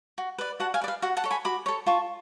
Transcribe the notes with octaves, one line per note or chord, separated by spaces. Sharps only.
F#4
B4 D5
F#4 F#5 A5
F5 G#5
B4 D5
F5
F#4 F#5
F#5 A5
A4 C#5
G#5 B5
F#4 B5 D6
A4 C#5
F4 A5 C#6